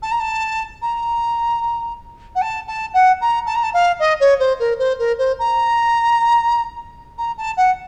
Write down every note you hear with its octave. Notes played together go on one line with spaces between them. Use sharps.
A5
A#5
A5
A#5
F#5
A5
A5
F#5
A#5
A5
A#5
A5
F5
D#5
C#5
C5
A#4
C5
A#4
C5
A#5
A#5
A5
F#5